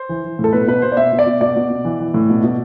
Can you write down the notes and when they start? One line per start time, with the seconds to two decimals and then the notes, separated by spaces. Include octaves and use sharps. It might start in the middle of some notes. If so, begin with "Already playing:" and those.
Already playing: C5
0.09 E3
0.24 E3
0.39 A2
0.44 A4
0.53 B2 B4
0.67 B2 B4
0.82 B2 C5
0.92 D5
0.97 B2 E5
1.12 B2
1.19 D5
1.27 B2
1.41 B2 D5
1.56 B2
1.70 B2
1.85 E3
2.00 E3
2.14 A2
2.30 B2
2.43 B2